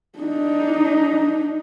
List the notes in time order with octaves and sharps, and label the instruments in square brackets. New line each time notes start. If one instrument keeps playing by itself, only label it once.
[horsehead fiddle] D4 D#4